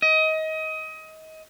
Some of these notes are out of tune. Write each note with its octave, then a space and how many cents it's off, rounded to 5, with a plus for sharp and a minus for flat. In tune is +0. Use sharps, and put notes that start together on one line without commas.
D#5 +25